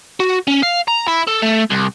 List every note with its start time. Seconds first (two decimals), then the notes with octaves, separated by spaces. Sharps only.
0.20 F#4
0.48 C#4
0.63 F5
0.88 A#5
1.08 E4
1.28 A4
1.43 A3
1.71 C2